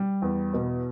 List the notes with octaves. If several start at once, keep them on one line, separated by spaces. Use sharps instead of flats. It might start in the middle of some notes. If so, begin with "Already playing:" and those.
Already playing: G3
E2
B2